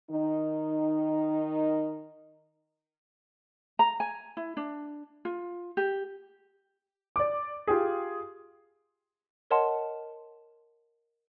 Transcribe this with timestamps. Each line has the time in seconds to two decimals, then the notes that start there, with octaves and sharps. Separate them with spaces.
0.10 D#3 D#4
3.79 A#5
4.00 G#5
4.37 E4
4.57 D4
5.25 F4
5.77 G4
7.16 D5 D6
7.67 F4 G4 G#4
9.51 A#4 C#5 D#5 F#5 A5 C6